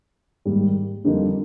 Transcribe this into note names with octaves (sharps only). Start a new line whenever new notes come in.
G#2 D#3 G3 A#3
F2 D3 G3 A#3 D#4